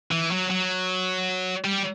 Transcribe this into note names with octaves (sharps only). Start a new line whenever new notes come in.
E3
F#3
F#3
G3